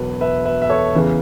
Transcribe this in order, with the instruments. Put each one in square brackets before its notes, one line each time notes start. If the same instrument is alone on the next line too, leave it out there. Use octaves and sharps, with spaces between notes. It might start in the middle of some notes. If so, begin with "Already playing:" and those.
Already playing: [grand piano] E1 E2 B2 F#3 B4
B4 E5
B4 E5
E5
A4 C#5
E2 C#3 E3